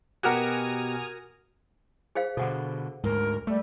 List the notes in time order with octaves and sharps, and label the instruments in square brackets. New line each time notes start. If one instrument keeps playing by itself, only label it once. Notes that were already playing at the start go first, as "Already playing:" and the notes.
[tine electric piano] B2 G4 F#5 [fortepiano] F#4 A#4 [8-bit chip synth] G#5 D#6 F6
[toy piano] G#4 C5 F5
[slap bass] B2 D3 [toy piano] A4 F#5
[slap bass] D2 G#2 [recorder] A#4
[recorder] G3 [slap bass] A3